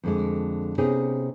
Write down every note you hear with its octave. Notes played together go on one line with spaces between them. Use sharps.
F2 D3 G#3
C3 B3 C#4 D#4 G4 G#4